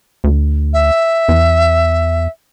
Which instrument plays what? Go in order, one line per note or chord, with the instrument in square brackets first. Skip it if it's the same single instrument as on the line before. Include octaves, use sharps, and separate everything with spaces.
[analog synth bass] D2
[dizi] E5
[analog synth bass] E2